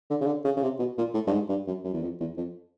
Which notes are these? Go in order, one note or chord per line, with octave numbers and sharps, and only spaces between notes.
D3
C#3
D3
C#3
C#3
C3
B2
A#2
A2
G2
G#2
G2
F#2
F#2
E2
F2
E2
F2